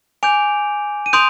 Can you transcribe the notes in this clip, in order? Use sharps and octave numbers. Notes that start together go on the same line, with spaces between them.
G#5 D6 G6 D7 F7
D#7
C6 D#6 G6 D7 F7